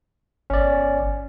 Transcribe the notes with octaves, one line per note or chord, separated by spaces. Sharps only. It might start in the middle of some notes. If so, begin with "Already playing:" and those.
G1 C#4 D5